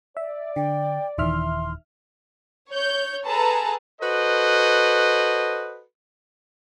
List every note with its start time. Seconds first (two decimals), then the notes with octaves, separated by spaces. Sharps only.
0.17 D5 E5
0.56 D3 G5
1.18 D#1 D#3 E3 E5 C6 F6
2.69 C#5 G6
3.25 G#4 A4 B4 A5 A#5
4.01 F#4 A4 B4 C5 D#5